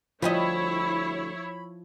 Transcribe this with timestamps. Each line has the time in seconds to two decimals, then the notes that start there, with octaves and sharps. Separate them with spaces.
0.22 D2 F3 G3 E4 C#5 D#5 B5